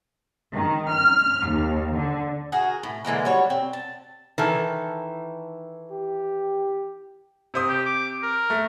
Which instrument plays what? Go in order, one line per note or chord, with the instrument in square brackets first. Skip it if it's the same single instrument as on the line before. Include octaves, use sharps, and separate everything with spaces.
[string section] D#3
F6
D#2
D3
[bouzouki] F#4 G#4 A#4
A2
D3 E3 G#3 A#3
G3 F#4 C#5
C4
A5
[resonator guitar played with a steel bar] D#3 E3 A4
[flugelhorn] G4
[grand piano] C3 C5 D#6
[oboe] G4
D6
A#4
[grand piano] A3